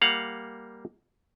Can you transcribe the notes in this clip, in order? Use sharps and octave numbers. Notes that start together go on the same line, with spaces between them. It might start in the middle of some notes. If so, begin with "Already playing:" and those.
G3 A#3 F5 F#5